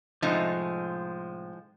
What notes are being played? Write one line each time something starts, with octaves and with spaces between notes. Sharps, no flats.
A2 C3 F3 G#3 D#4